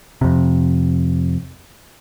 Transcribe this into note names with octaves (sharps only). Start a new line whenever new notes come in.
F2 C3